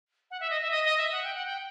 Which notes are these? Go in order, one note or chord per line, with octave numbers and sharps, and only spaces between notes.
F#5
E5
D#5
E5
D#5
D#5
E5
F#5
G5
F#5
G5